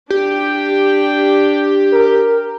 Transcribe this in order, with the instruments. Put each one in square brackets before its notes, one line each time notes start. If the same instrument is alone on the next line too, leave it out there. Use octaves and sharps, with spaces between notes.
[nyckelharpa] D4 G5 [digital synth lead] G4
[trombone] A#4